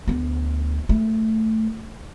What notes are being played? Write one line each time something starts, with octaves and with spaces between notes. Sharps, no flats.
D2 B3
A3